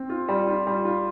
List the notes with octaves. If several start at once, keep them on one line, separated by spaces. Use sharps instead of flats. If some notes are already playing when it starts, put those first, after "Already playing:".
Already playing: C4
F4
G3
F4
G3
F4